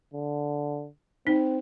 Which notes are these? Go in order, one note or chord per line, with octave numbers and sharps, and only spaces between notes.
D3
C4 D#4